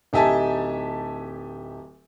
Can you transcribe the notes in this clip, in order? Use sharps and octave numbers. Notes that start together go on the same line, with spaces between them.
D1 D#4 G4 E5 G#5 A5